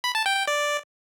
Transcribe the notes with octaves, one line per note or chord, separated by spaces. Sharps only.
B5
A5
G5
G5
D5